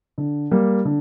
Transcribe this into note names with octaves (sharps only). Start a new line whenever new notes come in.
D3
G3 A#3
D3